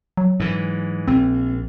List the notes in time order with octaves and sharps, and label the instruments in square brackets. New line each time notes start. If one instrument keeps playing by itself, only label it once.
[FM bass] F#3
[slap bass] G#2 E3
[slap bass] A#1 [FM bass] C4